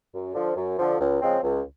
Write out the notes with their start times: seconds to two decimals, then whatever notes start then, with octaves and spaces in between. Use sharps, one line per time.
0.13 F#2
0.34 D3 F3
0.56 F#2
0.78 D3 F3
0.99 C#2
1.21 C#3 F3 G#3 C4
1.43 C#2